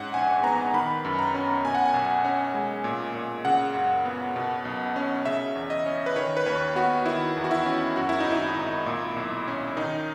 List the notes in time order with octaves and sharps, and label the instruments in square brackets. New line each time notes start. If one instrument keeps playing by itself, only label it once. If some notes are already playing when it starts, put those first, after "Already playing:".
Already playing: [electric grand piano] G#2 C#4 F#5
A#1 G#5
B3 A#5
D#3 B5
F#2
A#5
C#4
B2 G#5
F#5
G#5
B1
C#4
G#3
A#2
A#2
C#3 F#5
F#2
B3
B2
B1
C#4
C#3 E5
E2
D#5
C#4
B4
D#3 C#5
B4
D#2 C#5
B3 F#4
D#3 E4
E2
F#4
E4
C#4
F#2 F#4
E4
D#4
G#1
E4
G#1
A#2
B1
C#4
D#3 D#4